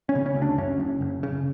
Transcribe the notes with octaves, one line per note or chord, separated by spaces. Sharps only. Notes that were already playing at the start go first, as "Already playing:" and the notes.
C#4
C#3
C#4
D2
D4
F#2 C#4
F#1
F#1
C#3